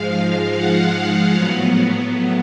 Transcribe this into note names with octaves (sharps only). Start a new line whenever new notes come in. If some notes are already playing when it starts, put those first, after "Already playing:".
Already playing: G#2 F3 G#3 F5
F#5
A2 F#3 B3